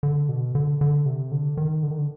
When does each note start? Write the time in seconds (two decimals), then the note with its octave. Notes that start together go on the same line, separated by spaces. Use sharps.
0.03 D3
0.29 B2
0.55 D3
0.81 D3
1.06 C3
1.32 D3
1.57 D#3
1.83 D3
1.91 D#3
1.98 D3